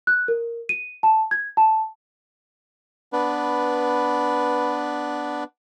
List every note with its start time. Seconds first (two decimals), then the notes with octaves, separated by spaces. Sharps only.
0.07 F#6
0.28 A#4
0.69 D#7
1.03 A5
1.31 G#6
1.57 A5
3.13 B3 D4 B4